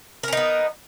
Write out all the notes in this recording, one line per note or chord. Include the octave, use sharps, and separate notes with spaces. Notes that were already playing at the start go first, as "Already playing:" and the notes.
B3 C#4 D#4 A#4